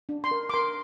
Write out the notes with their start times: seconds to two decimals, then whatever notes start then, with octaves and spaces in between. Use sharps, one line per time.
0.09 D4
0.24 C6
0.31 A#4
0.50 D6
0.54 A#4 C6